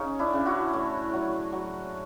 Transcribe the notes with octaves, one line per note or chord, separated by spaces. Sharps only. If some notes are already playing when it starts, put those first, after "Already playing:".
Already playing: C#3 C#4 D#4
D4 E4
C#3
E4 F#4
A2
F#3
F#3